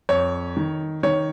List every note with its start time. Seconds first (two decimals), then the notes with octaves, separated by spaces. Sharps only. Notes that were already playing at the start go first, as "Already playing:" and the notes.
0.09 F2 C#5
0.57 D#3
1.03 D#3 C#5